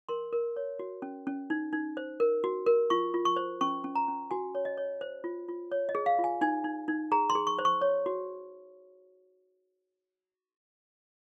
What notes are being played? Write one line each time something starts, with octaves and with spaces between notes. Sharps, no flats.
A#4 C6
A#4
C#5
F#4
C#4
C#4
D#4
D#4
C5
A#4
F#4
A#4
F4 C#6
F4
C#6
C5
C#4 C#6
C#4
A#5
C#4
F#4 G#5
C#5
D#5
C#5
C5
F4
F4
C#5
D#5
G#4
F5
F4
G#5
D#4 G#5
D#4
D#4
G#4 A#5
C6
G#4
C#6
C5
C#6
C#5
F#4